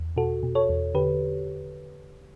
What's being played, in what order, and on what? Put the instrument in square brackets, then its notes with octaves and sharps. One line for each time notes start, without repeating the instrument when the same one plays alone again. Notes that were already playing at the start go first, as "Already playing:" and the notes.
Already playing: [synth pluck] E2
B2 F#4 A4
B2
A4 C#5
E2
D3 G4 B4